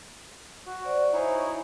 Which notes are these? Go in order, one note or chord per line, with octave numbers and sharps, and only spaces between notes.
F#4
C5 D5
D#4 E4 C5 C#5 G#5
C#6